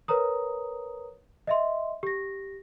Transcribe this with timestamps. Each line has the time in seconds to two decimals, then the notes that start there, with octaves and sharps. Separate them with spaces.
0.08 A#4 B4 C#5 A#5 D#6
1.47 D#5 E5 C6
2.03 G4 A#6